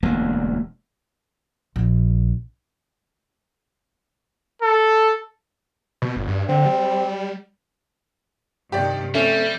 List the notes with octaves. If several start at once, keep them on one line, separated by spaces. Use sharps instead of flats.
E1 D2 A#3
A#1
A4
B2
G1
G2
D3 C4
G3
G2 C3 D#3 G4 D5
G3 A3 C4 C#4